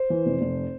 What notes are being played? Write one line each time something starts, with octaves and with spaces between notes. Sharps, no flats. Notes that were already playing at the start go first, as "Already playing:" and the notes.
Already playing: C5
E3
F1
F1